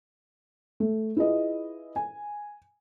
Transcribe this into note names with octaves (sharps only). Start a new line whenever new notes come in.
A3
E4 F4 G#4 B4 D#5
G#5